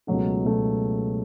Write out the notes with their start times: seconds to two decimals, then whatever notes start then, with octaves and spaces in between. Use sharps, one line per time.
0.07 C#2 B2 F#3 A3
0.45 B2 F#3 A3